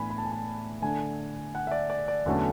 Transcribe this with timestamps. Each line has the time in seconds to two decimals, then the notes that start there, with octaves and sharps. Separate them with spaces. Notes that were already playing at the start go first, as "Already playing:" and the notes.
Already playing: A2 E3 B3 D4 G#5 B5
0.10 B5
0.18 A5
0.25 G#5
0.32 A5
0.82 D3 A3 D4 G#5
1.55 F#5
1.67 E5
1.71 D5
1.90 D5
2.08 D5
2.26 E2 D3 F#3 A3 C#4 A4